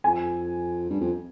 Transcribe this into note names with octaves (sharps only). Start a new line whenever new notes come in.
F2 G#5
G2
F2